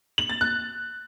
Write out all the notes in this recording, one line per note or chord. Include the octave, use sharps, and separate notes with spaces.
F#7
A6
F#6